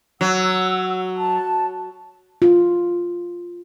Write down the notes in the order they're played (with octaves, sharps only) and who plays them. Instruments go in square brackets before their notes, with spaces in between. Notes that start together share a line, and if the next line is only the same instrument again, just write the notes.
[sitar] F#3 [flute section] F#5 E6
[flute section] A5
[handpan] F4